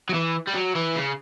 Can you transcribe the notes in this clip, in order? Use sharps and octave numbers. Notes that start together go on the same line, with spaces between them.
F#3
E3
G3
F#3
E3
C#3